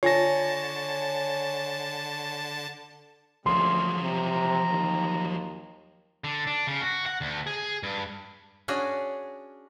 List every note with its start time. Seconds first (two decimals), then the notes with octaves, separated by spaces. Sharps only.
0.03 D3 F4 C#5 G#5 A5 A#6
3.46 D2 C#3 F3 F#3 G#3 A#3 C6
4.01 C3 A#5
4.70 D#2
6.24 D3
6.47 D4
6.67 C#3
6.81 F#4
7.06 F#5
7.21 D2
7.47 G#4
7.83 G2
8.68 C#4 D4 F#4 G#4